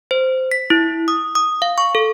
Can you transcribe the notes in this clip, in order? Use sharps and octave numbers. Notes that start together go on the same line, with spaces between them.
C5
B6
E4
D#6
D#6
F5
C#6
A4